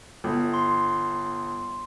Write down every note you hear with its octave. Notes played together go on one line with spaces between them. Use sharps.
G1
C6